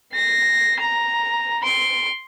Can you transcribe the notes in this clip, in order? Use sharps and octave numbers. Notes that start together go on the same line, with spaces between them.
A#6 C7
A#5
C6 D7